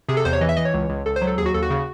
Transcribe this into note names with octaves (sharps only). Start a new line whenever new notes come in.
C3 G#4
A4
E2 C5
C#5
E3 D#5
E5
E3 D#5
C#5
C#2
C#2
C#2 A4
C5
F#3
A4
D#2 G#4
F#4
D#2 A4
F#4
C#3